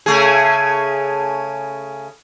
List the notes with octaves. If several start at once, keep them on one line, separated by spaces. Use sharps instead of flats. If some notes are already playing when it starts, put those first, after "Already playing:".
C#3 A3 G#4